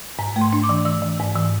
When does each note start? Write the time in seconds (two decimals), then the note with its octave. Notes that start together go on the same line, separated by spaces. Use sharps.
0.19 G#2 A#5
0.36 A3
0.41 C6
0.53 D4
0.63 D6
0.69 E3
0.85 E3 E6
1.02 E3
1.20 G#2
1.35 E3